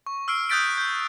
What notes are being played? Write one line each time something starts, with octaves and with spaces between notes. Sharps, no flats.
C#6
E6 F6 C7 D7
D#6 F#6 G6 A6 B6 D7
F#6 G6